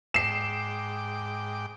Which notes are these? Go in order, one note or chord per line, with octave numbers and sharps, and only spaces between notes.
G#2 G5 D6 C7 E7